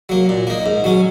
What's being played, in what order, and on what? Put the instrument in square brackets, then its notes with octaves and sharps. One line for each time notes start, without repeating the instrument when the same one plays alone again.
[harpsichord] F#3 A#3
A#2
A#3 D#4
G#2
F#3 C#4